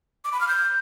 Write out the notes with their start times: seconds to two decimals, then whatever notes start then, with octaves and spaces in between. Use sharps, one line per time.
0.24 D6
0.32 B5
0.40 F6
0.48 G6